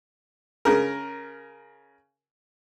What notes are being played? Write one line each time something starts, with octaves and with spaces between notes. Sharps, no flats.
C#3 A#4